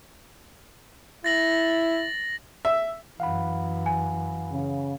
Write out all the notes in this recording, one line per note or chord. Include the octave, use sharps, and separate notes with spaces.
E4 A6 A#6 F#7
E5
F#2 E3 F5 F#5 B5
G#5
C#3